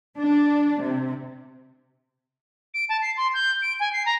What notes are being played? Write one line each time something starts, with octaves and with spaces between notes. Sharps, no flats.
D4
C3
D7
A5
C7
C6
G6
D7
G#5
C7
A#5